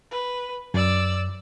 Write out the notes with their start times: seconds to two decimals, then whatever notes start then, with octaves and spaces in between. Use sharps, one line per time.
0.11 B4
0.74 F#2 D5 E6